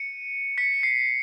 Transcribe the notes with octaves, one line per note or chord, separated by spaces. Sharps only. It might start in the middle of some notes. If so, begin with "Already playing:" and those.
Already playing: C#7 D#7
B6 C#7
C7